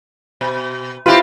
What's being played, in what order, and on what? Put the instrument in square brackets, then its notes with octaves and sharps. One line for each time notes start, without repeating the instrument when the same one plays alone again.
[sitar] B2
[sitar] C4 G4 B4 [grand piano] E4 F4